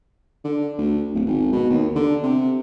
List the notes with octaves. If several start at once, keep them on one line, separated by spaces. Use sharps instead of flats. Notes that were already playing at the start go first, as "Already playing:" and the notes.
D3
D2
D1
G#1
B2
D#2
D3
C3